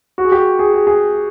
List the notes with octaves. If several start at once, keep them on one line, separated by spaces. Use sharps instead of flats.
F#4
G#4
G4
G#4
G#4
G#4